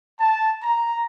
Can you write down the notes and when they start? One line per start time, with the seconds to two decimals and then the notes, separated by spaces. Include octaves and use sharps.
0.19 A5
0.62 A#5